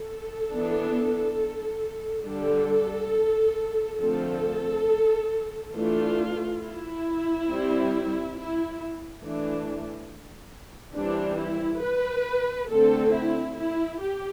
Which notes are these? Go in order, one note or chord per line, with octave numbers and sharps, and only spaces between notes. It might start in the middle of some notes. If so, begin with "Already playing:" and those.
Already playing: A4
E3 B3 D4
D3 G3 D4 A4
D3 F3 A3 C4 A4
E3 A3 D4 F4
E4
G3 C4
E4
E3 A3 D4
E3 G3 C4 D4
E4
B4
D3 A3 C4 A4
E4
E4
G4